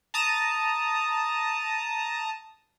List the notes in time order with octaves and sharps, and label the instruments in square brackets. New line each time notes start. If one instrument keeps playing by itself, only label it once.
[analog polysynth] A5 A#5 D#6